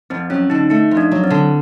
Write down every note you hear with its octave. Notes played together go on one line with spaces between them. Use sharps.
F2 C4
F#3 C#4
D3 D#4
A3 D#4
F2
D4
F#3
C4
D3